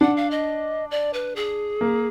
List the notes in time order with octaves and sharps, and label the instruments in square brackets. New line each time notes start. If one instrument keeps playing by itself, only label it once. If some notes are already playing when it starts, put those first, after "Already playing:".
[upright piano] D4 [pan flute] F#5
[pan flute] F5
D#5
D5
B4
G#4
[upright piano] A#3